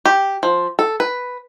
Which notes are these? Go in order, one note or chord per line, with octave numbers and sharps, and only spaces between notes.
G4
F3
A4
B4